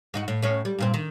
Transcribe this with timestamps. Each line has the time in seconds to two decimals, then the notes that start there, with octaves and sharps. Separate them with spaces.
0.14 G#2 D#4 F#4
0.28 A2
0.42 A2 C#4
0.65 G3
0.78 G2 A#2 C4
0.94 D#3